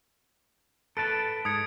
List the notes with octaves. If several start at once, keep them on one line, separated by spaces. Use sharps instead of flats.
A4 B4 A5 D7
G#2 D#6 G#6 C#7